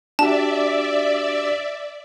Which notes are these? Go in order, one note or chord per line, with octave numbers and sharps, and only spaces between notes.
D4 F#4 G4 D5 E5 A5